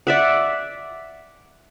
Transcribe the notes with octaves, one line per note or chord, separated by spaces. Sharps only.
D5 E5 F#5